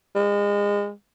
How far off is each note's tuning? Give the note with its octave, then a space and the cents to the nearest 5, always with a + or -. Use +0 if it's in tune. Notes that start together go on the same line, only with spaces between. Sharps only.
G#3 -30